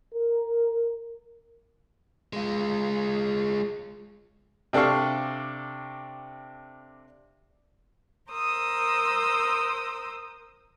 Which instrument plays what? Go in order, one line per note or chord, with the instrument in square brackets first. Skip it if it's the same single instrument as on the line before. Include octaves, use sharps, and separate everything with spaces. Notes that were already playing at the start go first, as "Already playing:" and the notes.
[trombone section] A#4
[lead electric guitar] G#3 F4
[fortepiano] C3 D4 A4 F5 C#6
[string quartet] A#4 C5 D#6 E6